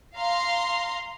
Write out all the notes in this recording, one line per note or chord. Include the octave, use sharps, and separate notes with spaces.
F5 A#5 C6